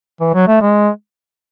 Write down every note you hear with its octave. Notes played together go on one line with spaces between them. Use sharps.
E3
F#3
A3
G#3